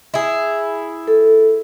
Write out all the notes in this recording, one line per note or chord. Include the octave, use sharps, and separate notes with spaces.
E4 G#4
A4